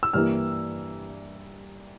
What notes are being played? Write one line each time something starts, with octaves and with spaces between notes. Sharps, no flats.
E6
G2 E3 G3 A#3 F6